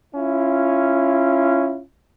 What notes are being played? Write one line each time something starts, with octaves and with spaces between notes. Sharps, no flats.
C#4 E4 F4